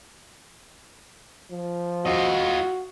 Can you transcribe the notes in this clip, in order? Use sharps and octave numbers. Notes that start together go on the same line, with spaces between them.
F3
F4 F#4 D#5